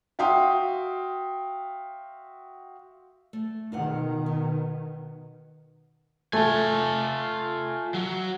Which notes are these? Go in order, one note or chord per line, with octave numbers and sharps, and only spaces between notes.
F#4 E5 F5 G5 C6 D#6
A3
B2 D#3 F4 A#4 F#5
B3
A3 F4 G#5
F#3